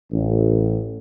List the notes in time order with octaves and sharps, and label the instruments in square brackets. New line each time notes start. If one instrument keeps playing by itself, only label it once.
[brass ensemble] A1